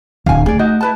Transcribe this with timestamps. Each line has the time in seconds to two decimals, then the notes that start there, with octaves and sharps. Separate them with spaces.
0.26 D1 F5 G#5
0.46 A3 G#4 D5
0.59 D#4 F#4 D#5
0.81 E4 B4 A5